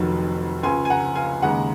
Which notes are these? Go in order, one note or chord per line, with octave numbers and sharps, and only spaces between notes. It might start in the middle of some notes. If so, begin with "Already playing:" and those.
Already playing: F1 F2 D#3 F#3
C#2 C#3 F3 G#5 C6
G#5
F#5 A#5
F5 G#5
D#2 C#3 G#3 F#5 A#5